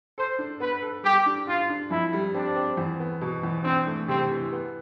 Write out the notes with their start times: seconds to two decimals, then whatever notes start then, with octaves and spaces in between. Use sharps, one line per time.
0.17 A4 C5
0.39 D4
0.60 B3 B4
0.82 A4
1.03 G3 G4
1.26 D4
1.47 D4 F4
1.70 D4
1.91 F2 E4
2.13 G3
2.34 C4 D4
2.56 C4
2.77 E2
3.00 B3
3.21 B2
3.43 E2
3.64 C4 D4
3.87 A3
4.08 C3 C4
4.30 E3
4.52 B3